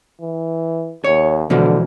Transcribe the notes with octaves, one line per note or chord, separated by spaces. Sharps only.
E3
D#2 C#5
B2 D3 E3 F3